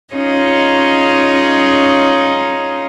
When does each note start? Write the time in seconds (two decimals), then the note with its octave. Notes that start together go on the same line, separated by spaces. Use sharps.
0.15 C#4 D#4 F4 G#4 C#5 D#5